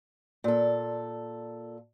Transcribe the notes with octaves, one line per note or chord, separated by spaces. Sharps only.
A#2 A4